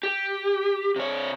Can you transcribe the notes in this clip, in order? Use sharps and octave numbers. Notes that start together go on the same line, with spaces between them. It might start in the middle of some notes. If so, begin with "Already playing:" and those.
G4
C3 C#5